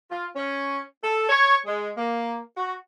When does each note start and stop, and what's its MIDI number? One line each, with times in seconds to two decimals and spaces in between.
0.10 0.26 65
0.35 0.81 61
1.03 1.27 69
1.29 1.57 73
1.66 1.92 56
1.97 2.39 58
2.57 2.76 66